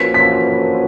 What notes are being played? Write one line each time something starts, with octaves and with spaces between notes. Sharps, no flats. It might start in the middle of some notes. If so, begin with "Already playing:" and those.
Already playing: F3 A#3 C#4 F#4 B4 B6
B6